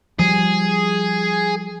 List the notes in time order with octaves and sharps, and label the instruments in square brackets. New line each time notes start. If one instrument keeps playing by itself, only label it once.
[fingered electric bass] F3 G3 [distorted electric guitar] G#4